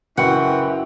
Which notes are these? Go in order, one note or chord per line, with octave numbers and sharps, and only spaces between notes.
F#1 E3 F#4 B4 F#5 G5